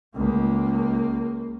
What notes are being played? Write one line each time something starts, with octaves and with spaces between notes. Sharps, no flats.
C#2 A#3